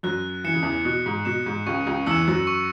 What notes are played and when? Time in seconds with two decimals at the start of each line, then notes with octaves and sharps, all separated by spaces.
0.03 F#2 F#3 F#6
0.44 E3 C#7 E7
0.54 C#3
0.62 E2 E3
0.85 B2 F#6
1.06 G#2
1.25 B2 C#7 E7
1.46 G#2
1.66 C#2 C#3 C#6
1.87 C#2 C#3
2.06 E2 E3 E6 C#7 E7
2.28 F#2 F#3
2.47 C#6